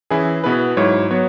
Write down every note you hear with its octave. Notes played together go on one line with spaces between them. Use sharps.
E3 C#4 E4 G#4
B2 B3 E4 G#4 B4
G#2 F#3 E4 C#5
F#3 B3 F#4 C#5